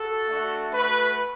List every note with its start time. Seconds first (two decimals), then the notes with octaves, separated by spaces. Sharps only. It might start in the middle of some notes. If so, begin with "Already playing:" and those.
Already playing: F#4 A4
0.28 A3 D4 F#4
0.72 A3 F#4 B4